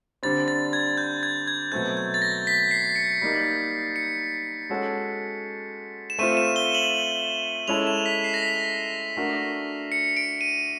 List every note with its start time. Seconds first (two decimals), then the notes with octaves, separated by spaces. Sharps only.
0.23 D3 G3 C4 A6
0.48 A6
0.73 G#6
0.98 G6
1.23 G#6
1.48 G#6
1.72 B2 F#3 A3 C4 G6
1.97 G6
2.14 A6
2.22 A#6
2.47 B6
2.71 C7
2.96 C#7
3.21 G3 A#3 D#4
3.96 C#7
4.70 G#3 C#4 F#4 A4
6.10 E7
6.19 A3 C4 F4 D#7
6.37 E7
6.56 G7
6.75 F#7
7.68 G#3 C#4 E4 A4 F7
7.87 E7
8.06 B6
8.24 C7
8.34 A#6
8.42 B6
9.17 A3 D4 F#4 A#4
9.92 C#7
10.17 D7
10.41 D#7